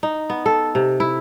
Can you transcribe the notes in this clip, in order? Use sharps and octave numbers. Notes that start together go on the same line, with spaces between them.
D#4
B3
A4
C3
E4